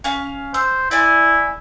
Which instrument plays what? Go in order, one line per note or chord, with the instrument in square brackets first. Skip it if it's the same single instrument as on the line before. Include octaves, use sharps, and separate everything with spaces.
[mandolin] C#4 F5
[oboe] C5 [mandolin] E6
[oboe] E4 [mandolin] D5 G#5